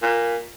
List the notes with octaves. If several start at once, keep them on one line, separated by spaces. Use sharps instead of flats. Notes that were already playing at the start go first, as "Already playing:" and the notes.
A#2